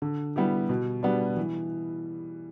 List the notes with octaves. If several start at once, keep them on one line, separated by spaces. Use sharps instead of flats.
D3
G3 B3 E4 G4
B2
G3 B3 D4
E3